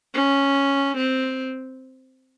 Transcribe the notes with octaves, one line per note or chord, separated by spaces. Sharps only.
C#4
C4